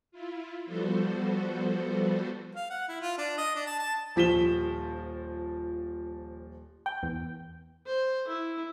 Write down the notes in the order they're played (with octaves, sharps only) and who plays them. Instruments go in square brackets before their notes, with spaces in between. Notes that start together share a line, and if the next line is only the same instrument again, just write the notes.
[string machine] E4 F4
F3 G3 B3 F#4 A4 C5
[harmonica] F5
F#5
E4
F4
D4
D#5
D4
A5
A5
[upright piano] D#1 F3 B6 E7 G7
[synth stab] G5
E2
[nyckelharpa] C5
E4